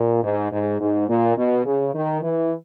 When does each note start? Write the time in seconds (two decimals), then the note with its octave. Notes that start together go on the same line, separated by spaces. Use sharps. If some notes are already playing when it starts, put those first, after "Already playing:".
Already playing: A#2
0.23 G#2
0.52 G#2
0.80 G#2
1.08 A#2
1.36 B2
1.65 C#3
1.94 D#3
2.22 E3